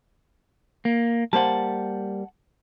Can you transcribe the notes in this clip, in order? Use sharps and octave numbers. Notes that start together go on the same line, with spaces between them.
A#3
G3 A#3 C5 F#5 A5